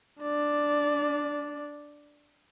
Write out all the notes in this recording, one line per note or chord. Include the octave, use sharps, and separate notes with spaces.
D4 D5